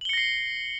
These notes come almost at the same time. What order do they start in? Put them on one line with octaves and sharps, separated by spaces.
F#7 G7 C#7 A#6 C7